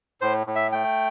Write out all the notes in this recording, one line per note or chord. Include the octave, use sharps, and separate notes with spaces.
A2 C5
A2
E5
A3 G5